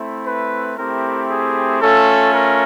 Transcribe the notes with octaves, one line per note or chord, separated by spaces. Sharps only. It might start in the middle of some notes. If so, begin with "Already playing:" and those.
Already playing: A3 C4 E4
B4
A3 C4 E4 G4 A#4
G#4
A3 C#4 F4 A4
A#4